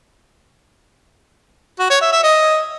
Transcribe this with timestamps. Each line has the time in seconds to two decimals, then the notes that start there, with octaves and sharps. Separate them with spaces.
1.79 F#4
1.90 C#5
2.01 E5
2.12 E5
2.23 D#5